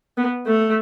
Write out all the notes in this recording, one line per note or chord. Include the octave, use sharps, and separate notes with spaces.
B3
A3